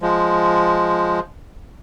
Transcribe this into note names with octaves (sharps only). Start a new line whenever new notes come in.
F3 G#3